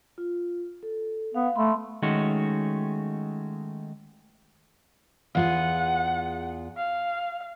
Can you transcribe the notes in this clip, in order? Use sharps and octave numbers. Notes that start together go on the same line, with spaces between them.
F4
A4
B3 F5
A3 B5 C6
D#3 G#3 A3 C#4 F#4
E2 F4 G#4 F#5
F5